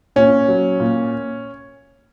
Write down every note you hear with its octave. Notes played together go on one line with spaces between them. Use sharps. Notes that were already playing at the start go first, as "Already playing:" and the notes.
A#2 C#4
F#3
A#2